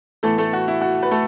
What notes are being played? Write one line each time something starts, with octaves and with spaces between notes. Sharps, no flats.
A2 E3 A3 B3 A4
A3 A4
F#4
E4
F#4
B4
A3 A4